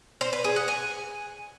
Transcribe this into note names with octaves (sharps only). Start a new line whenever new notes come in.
C5
B4
G#4
F#5
G#5